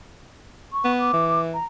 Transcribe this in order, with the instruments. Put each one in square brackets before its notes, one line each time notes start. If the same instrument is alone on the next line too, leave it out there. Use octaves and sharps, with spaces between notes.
[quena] C#6
[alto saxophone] B3
[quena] D6
[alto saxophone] E3
[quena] A#5